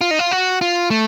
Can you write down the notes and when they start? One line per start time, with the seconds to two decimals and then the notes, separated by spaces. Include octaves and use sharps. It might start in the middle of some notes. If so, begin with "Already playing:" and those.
0.01 F4
0.11 D#4
0.19 F4
0.31 F#4
0.61 F4
0.90 A3